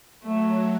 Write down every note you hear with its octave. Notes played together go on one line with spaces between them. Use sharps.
F#3 A3